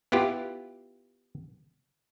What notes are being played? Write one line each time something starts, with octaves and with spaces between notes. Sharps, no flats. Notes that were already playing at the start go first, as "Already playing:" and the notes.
B3 E4 F4 G4